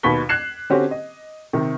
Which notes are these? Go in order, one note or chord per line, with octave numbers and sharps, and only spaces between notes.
D#2 B2 B5 C#6 B6 G7
F#6 G#6 C7 E7
D3 C4 C#4 F#4 G4 C5
D#5
C3 D#3